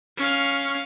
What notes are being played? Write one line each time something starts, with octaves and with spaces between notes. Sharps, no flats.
C#4 F5